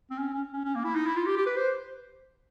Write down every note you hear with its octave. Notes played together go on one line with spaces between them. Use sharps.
C4
C#4
C#4
C#4
C#4
A#3
E4
D#4
E4
F4
G4
G4
B4
C5